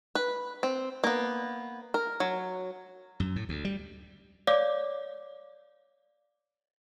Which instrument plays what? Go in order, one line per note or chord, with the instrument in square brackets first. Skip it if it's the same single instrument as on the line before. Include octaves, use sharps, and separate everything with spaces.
[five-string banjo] B4
C4
A#3 B3
A#4
F#3
[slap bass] F#2
A2
D2
G3
[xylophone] C#5 D5 F5 D6